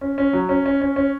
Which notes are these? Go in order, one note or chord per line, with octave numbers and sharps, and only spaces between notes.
C#4
C#4
F#3
C#4
C#4
C#4
C#4